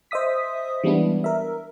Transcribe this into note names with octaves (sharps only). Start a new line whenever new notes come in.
C5 D#5 E5 D#6 B6
E3 G3 G#3 B3 D4 E4
A#4 E5